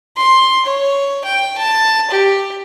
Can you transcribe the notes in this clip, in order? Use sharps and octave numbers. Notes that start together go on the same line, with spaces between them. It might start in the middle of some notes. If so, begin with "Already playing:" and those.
C6
C#5
G5
A5
G4